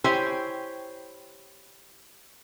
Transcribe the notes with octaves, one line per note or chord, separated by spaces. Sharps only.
E4 G4 C5 C#5 G5 G#5